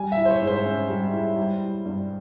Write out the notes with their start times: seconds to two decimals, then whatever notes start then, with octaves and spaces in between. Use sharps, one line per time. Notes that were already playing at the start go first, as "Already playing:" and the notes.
Already playing: G3 G#5
0.12 E5
0.17 E4
0.25 C5
0.30 C#5
0.42 G#2
0.47 C5
0.65 C#4
0.90 G3
1.13 E4
1.36 G3
1.61 E4
1.85 G2